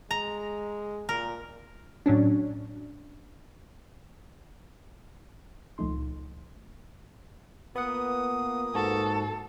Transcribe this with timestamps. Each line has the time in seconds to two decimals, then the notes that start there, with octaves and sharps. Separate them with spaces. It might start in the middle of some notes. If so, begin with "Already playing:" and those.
0.11 G#3 A#5
1.09 A#2 A#4
2.06 A2 F#3 C#4 D4
5.78 C#2 A#2 F3 A3 D#4 C6
7.75 A#3 B3 F4 B4 F#5 D#6
8.75 G#2 F#4 A4